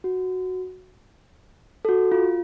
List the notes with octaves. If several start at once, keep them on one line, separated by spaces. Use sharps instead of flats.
F#4
A4
F#4
F4